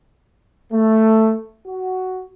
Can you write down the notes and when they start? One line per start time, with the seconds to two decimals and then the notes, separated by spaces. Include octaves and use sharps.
0.71 A3
1.67 F#4